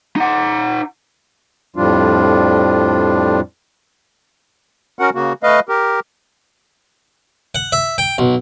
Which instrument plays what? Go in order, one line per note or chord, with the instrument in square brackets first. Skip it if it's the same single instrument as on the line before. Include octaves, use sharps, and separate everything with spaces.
[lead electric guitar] D#4 F#5
[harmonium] F2 A2 F3 G3 D4 F4
[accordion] C#4 F#4 A#4 F#5
C#3 A#3 F#4
A3 B4 D#5 F5
G4 A#4
[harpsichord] F#5
E5
G5
B1